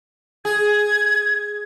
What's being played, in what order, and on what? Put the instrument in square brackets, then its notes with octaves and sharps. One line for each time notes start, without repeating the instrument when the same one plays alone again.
[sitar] G#4 [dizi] G#6